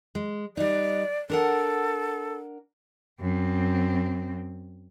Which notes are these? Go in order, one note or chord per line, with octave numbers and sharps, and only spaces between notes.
G#3
G3 D#4 D5
D4 A4 A#4 F#5
F#2 C4